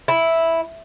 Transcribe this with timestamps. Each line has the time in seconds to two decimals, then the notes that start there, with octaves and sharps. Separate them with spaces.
0.08 E4